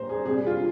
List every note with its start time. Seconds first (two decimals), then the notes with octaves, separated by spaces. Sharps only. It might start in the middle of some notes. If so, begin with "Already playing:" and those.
Already playing: A#2 G3 C5 A#5
0.09 G#4
0.25 C3 G#4
0.28 G3
0.47 F4